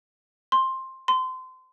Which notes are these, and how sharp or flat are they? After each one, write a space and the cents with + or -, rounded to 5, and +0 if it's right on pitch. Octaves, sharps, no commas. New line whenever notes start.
C6 +10
C6 -25